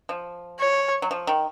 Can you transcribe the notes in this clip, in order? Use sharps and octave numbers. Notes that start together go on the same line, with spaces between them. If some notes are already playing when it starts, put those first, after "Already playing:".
F3
C#5
F#3
F3
D#3